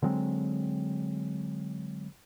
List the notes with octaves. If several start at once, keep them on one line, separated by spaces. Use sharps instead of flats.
D3 F#3 G#3 C4